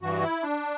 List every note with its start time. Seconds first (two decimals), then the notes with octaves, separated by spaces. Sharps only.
0.01 G2 E3 F#4
0.22 E4
0.43 D4